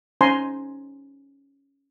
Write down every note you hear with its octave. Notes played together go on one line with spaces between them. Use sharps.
C#4 D#4 C5 G#5 A#5 C6